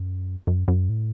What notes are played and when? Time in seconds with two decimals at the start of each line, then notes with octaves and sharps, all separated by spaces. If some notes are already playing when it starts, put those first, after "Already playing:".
Already playing: F#2
0.47 F#2
0.68 F#2
0.89 A2